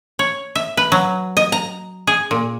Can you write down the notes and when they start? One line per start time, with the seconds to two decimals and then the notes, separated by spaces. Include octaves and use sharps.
0.19 C#5
0.55 E5
0.77 B4
0.92 F#3
1.37 D#5
1.52 A#5
2.07 G#4
2.31 A#2